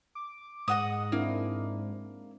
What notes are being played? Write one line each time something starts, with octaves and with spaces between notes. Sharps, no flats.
D6
G#2 D#5 F#5 D#6
A#3 C4 D4 E4